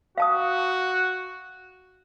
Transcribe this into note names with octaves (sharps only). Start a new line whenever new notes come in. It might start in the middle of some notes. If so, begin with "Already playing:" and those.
F#4 F5 A5 D#6